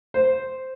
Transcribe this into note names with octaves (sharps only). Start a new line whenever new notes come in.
C5